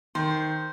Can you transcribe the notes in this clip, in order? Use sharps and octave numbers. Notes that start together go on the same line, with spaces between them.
D#3 C5